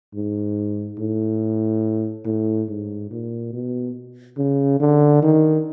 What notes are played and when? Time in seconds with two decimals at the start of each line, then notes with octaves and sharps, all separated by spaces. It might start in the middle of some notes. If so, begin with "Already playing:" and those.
0.14 G#2
0.99 A2
2.26 A2
2.69 G#2
3.11 A#2
3.53 B2
4.37 C#3
4.80 D3
5.22 D#3